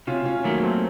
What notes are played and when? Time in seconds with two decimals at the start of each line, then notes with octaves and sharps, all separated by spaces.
0.07 C3 C#4 F4
0.25 C#4 F4
0.44 D#3 F#3 A3 A#3
0.63 A3 C4